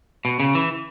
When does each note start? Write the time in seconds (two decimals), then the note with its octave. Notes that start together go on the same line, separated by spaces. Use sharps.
0.25 B2
0.40 C#3
0.55 E3